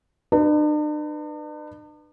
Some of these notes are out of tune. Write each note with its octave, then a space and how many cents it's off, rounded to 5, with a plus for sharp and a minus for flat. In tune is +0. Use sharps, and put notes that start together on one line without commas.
D4 +45 B4 +0